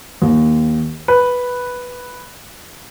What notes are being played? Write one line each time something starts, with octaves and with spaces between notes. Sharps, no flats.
D#2
B4